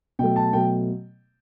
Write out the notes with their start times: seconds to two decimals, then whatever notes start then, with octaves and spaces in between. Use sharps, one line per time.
0.19 B2 F#3 A3 G5
0.36 A5
0.53 B2 F#3 A3 G5